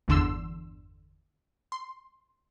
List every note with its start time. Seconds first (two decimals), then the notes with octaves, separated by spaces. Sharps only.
0.08 G1 E2 D3 C6 E6
1.72 C6